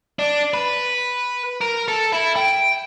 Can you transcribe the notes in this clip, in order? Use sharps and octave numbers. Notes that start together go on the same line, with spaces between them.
D4
B4
A#4
A4
E4
G5